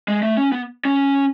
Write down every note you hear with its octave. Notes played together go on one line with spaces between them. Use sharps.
G#3
A3
C#4
B3
C#4